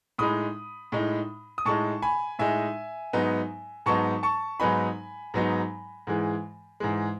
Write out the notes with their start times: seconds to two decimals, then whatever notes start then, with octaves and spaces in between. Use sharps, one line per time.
0.18 A2 G#3 D#4 B5 D#6
0.92 A2 G#3 D#4
1.58 D#6
1.65 A2 G#3 D#4 A5 C#6
2.02 G#5 B5
2.39 A2 G#3 D#4 E5 G#5
3.13 G#2 F#3 B3 D#4
3.86 G#2 F#3 B3 D#4 A5 C#6
4.23 A5 C#6
4.60 G#2 F#3 B3 D#4 G#5 B5
5.34 G#2 F#3 B3 D#4
6.07 G#2 E3 G#3
6.80 G#2 E3 G#3